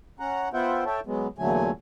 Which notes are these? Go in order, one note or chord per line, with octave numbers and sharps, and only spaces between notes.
C#4 F#5 A#5
B3 F4 C5 E5 F#5 G5
A4 C#5 E5 G5 A5
F#3 G#3 B3
E2 A#2 D3 F#3 A3 G#5